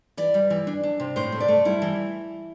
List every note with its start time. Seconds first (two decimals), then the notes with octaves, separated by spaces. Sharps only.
0.17 E3 D5
0.34 G3
0.50 E3
0.67 D4
0.83 D4
1.00 C3
1.16 A2 C5
1.32 A3
1.40 D5
1.48 A3
1.65 G3 E4
1.82 E3